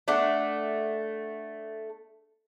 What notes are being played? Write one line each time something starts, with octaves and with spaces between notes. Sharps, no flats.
A3 D4 F#5